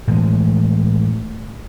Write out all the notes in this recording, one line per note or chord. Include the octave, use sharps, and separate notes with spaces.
A2 E3 G#3